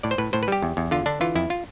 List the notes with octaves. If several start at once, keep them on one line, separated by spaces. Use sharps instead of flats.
A2 D5
C5
A2 B4
A2 C5
B4
G3 G4
E2
E2
D3 F4
D3 D4
E3 F4
F2 E4
F4